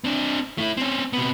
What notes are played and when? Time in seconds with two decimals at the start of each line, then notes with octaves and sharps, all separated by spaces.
0.04 C4 D4
0.58 A3 E4
0.77 C4 C#4
1.13 C3 B3